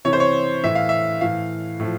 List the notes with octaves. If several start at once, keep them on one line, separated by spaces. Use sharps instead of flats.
C3 E3 C#5
C5
C#5
A2 E3 E5
F5
E5
A2 E3 F5
A2 F3